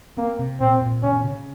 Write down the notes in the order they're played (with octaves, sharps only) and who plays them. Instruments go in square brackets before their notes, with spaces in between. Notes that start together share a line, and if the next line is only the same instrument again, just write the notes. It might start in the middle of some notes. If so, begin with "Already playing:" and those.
[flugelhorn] A#3 [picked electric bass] C4
[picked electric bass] C3
[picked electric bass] A#2 [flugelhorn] C4
[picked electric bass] A#2
[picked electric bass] C#3 [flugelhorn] C#4
[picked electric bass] C#3